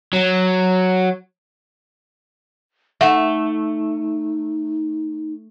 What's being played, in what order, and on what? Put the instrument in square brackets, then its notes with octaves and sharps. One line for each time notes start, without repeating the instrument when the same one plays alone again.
[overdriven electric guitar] F#3
[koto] A3 [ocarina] D#4 [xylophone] E5 F#5 E7